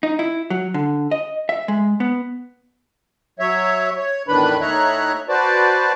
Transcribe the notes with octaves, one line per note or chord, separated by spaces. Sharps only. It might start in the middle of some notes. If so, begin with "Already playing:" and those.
D#4
E4
F#3
D3
D#5
E5
G#3
B3
F#3 C#5 E5
C#5
E2 A2 D#3 D4 B4 B5
A2 D#4 C#5 E5 A#5 F#6
F#4 B4 C5 D5 A5